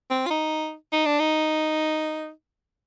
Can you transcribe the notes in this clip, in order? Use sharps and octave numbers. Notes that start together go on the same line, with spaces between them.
C4
F4
D#4
D#4
D4
D#4